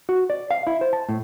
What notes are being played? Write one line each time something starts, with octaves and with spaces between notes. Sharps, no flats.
F#4
D5
F5
E4
C5
A5
A2